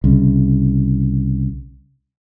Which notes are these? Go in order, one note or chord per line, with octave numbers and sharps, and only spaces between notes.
C2 C#3